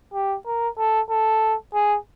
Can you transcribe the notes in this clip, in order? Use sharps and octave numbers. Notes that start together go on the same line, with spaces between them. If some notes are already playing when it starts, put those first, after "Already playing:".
G4
A#4
A4
A4
G#4